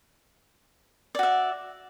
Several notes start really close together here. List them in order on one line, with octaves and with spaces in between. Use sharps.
D5 F#4 E5